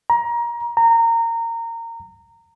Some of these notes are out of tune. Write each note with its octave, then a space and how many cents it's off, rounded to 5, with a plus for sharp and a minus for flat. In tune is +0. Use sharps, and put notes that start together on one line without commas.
A#5 +25
A#5 -20